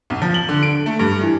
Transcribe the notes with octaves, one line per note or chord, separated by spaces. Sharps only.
B1
F3
F#7
D3
D7
A3
G2
E3